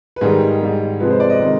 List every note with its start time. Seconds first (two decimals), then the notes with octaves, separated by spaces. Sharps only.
0.16 B4
0.21 G#2 D#3 G3 G#4
0.61 G#2 G3
1.00 C3 F3 G#3 B4
1.10 C5
1.20 D5
1.30 D#5
1.40 C3 D#3 G#3